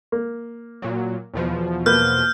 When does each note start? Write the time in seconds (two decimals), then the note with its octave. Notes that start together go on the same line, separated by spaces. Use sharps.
0.12 A#3
0.82 A#2 F#3
1.34 E2 B2 F3
1.86 A#3 B4 F6 G6